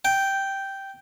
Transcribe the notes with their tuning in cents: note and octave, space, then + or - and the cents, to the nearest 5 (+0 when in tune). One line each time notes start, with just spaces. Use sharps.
G5 -5